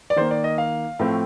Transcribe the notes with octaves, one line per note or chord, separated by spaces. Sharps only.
D5
D#3 A#3 C5
D5
D#5
F5
A2 F3 A3 C4